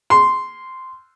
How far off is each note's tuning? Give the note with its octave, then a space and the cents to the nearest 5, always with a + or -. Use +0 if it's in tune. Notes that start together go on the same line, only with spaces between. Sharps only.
C6 -10